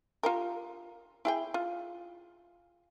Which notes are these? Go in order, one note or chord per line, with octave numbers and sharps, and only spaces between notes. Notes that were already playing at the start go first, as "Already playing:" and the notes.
F4 G4 A#4
E4 G#4 G5
F4